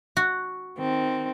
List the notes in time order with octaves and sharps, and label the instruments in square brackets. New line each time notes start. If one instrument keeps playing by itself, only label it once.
[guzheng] F#4
[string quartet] D#3 C4